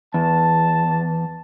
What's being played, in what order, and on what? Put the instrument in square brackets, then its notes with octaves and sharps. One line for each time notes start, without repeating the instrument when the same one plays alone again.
[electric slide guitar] E2 [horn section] A5